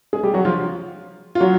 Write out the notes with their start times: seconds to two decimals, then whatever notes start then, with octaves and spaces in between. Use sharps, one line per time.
0.13 G#3 G#4
0.23 G3 G4
0.34 F#3 F#4
0.45 F3 F4
1.35 F4
1.40 F#3 F#4